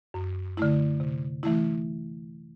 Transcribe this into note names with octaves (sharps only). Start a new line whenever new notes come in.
F#2
D3 A3 E4
C3
E3 A3 E4